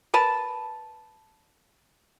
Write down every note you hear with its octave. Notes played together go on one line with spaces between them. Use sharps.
A#4 B4 A5